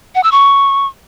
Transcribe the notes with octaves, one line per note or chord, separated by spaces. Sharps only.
F#5
E6
C#6